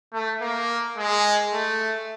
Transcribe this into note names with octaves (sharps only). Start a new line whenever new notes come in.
A3
A#3
G#3
A3